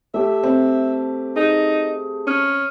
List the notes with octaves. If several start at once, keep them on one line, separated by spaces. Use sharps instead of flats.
A3 G4 A4 E5
C4
D#4 G#4
C#4 D#6 F6